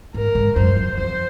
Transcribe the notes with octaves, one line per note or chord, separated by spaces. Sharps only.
G#2 A#4
G#2
F#2 C5
F#2
F2 C5